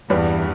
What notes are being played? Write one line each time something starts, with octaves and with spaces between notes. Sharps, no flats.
E2 G2 E3 G3 D4 B4